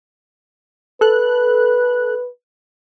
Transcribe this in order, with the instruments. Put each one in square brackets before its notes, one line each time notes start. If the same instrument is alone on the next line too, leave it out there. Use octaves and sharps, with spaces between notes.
[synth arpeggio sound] A4 F#6 [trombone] B4